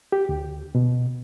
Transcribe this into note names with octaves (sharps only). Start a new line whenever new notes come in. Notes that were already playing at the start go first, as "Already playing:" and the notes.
G4
D2
B2